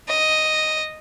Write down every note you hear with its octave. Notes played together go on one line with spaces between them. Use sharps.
D#5